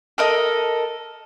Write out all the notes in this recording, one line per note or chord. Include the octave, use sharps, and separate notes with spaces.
A4 A#4 D#5